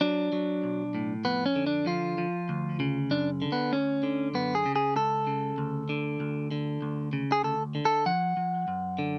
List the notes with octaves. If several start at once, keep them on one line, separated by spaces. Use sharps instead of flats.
F#3 D4
F#3
B1
A2
F2 B3
C#4
D3
D4
F3 F4
F3
D2
C#3
F#2 D4
D3
B3
D2 C#4
D3
F#2 B3
G#4
C#3
G#4
C#2 A4
C#3
D2
D3
D2
D3
D2
C#3
G#4
D2 A4
D3
A4
F3 F#5
F3
F#2
D3